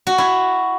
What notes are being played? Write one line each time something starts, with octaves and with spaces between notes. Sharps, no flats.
F#4
E4